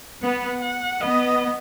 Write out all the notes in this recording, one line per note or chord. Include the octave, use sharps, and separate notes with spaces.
B3 F#5
F#5
B3 D#5